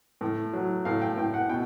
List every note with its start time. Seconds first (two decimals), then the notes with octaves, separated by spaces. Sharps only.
0.21 A2
0.53 F#3
0.85 A2 F5
1.01 G5
1.17 A2 G5
1.34 F#5
1.49 B2 G5